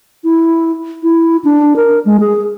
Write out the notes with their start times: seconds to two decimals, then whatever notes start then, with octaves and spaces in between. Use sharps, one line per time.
0.24 E4
1.03 E4
1.44 D4
1.76 A#4
2.05 G#3
2.20 G#4